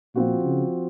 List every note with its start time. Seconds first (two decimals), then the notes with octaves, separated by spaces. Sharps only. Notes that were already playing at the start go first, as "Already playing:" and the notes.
0.15 A#2 F3 C4 F#4
0.44 C#3